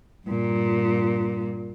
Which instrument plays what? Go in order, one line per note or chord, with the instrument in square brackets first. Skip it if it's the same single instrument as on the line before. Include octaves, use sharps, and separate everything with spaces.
[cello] G2 A#2